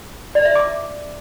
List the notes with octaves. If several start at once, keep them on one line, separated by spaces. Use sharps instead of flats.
D5
E5
D6